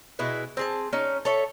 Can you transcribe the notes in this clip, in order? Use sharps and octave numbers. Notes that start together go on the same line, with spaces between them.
B2 G#3 E4 B4
C4 G#4 A5
C#4 D#4
A4 C#5 E5